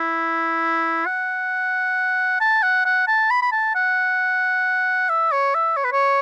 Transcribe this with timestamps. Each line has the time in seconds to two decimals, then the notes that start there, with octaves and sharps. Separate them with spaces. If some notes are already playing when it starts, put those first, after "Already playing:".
Already playing: E4
1.06 F#5
2.41 A5
2.63 F#5
2.85 F#5
3.08 A5
3.31 B5
3.42 B5
3.52 A5
3.75 F#5
5.09 E5
5.32 C#5
5.55 E5
5.77 C#5
5.84 B4
5.92 C#5